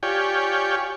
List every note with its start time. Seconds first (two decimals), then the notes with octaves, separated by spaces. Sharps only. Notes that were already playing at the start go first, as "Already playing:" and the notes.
0.03 F4 G4 C#5 D5 G5 G#5